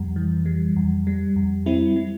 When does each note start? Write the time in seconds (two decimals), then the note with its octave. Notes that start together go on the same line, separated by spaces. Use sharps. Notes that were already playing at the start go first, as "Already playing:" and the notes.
Already playing: F2 G3
0.16 E3
0.46 G3
0.76 F2
1.07 G3
1.36 F2
1.66 G3 C4 E4
1.96 G3